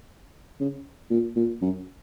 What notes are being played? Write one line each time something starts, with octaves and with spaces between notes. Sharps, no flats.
C#3
A#2
A#2
F#2